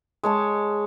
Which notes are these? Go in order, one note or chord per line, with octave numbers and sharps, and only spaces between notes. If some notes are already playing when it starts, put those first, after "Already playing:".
G#3 C#5 A5